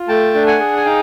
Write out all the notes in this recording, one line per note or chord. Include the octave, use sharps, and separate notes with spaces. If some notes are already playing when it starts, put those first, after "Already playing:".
Already playing: F4
A3 G5 A5
D4
F#5 G#5
G#4
G#5
D#4 F5 G5